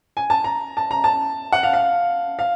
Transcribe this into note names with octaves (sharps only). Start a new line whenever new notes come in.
G#5
A5
A#5
A5
A#5
A5
F#5
F5
F5
F5